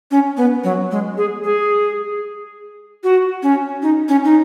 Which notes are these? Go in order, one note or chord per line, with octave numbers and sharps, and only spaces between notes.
C#4
B3
F#3
G#3
G#4
G#4
F#4
C#4
D#4
C#4
D#4